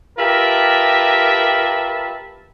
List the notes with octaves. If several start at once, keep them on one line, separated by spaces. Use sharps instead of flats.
F4 G4 A#4 B4 E5 A5